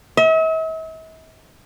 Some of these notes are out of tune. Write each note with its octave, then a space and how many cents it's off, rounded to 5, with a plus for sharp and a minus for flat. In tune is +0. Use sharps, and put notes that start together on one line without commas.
E5 -45